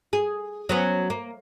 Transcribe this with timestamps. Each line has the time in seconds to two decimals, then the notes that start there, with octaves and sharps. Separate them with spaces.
0.13 G#4
0.69 F#3 B3 C#4
1.10 A#3